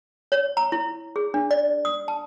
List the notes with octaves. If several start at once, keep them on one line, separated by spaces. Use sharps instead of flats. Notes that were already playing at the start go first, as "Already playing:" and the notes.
C#5
A#5
E4
G#4
D4
D5
D#6
A5